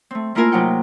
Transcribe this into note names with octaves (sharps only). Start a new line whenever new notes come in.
A3 C4
A3 A#3 E4 F4 A#4 G#5
C3 F#3 D#4 F#5 G5